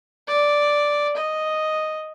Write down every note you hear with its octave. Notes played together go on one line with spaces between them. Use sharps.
D5
D#5